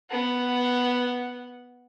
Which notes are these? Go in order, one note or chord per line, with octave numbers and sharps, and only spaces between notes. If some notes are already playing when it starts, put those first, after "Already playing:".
B3 F#5